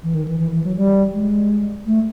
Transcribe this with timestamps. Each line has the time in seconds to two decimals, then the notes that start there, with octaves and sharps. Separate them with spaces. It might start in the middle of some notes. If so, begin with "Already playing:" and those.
0.03 E3
0.15 D#3
0.28 E3
0.40 E3
0.52 E3
0.64 F#3
0.76 G3
1.12 G#3
1.86 A3